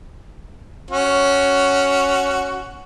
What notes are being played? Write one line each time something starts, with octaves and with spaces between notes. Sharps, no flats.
C#4 F#4